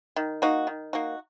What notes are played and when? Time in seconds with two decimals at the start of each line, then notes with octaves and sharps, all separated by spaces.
0.16 D#3
0.42 A#3 D#4 F#4
0.67 D#3
0.93 A#3 D#4 F#4